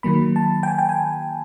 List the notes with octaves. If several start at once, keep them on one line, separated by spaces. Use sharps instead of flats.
D#3 F#3 A#3 B5
A5
G5
G#5
G5
G#5